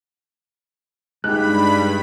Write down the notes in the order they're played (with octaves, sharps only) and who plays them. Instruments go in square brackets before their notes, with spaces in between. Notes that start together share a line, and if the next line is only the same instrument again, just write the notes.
[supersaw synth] G2 B5 [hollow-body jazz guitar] G#3 D#4 G4 [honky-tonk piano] F#6